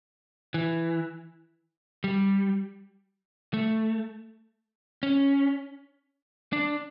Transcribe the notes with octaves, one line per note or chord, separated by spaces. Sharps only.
E3
G3
A3
C#4
D4